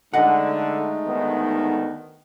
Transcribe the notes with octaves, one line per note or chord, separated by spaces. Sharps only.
D3 G#3 A3 D#4 D#5 F#5
D2 D#3 B3